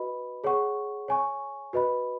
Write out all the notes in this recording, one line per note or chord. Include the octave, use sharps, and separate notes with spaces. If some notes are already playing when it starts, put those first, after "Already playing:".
Already playing: F#4 B4 D#5 B5
G#4 C#5 F#5 C#6
C#5 G#5 C#6
F#4 B4 D#5 B5